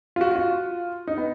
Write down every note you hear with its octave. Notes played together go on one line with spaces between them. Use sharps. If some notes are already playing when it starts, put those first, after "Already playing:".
F4
F#4
F#4
F4
D#4
B3